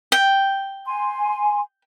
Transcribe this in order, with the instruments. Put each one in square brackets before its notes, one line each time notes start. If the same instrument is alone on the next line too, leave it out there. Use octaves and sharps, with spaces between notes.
[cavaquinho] G5
[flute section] G#5 C6